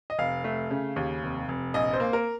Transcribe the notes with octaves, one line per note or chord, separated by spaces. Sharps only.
D#5
F1 F5
A3
C#3
D#2
F1
F1
A#1 D#5
C5
A#3
A#4